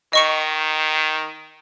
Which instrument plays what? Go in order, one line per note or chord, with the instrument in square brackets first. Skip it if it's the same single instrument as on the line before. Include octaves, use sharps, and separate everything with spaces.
[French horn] D#3 [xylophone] D#5 C#6 C#7